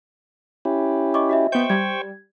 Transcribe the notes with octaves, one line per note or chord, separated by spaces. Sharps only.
C#4 E4 G4
D#5 C#6 D6
F#4 D#5 E5
B3 C5 G5 C#6 G6
G3 G#6